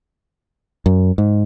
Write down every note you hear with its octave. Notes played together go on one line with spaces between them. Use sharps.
F#2
G#2